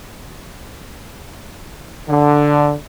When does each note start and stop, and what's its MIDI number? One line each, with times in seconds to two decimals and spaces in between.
2.08 2.73 50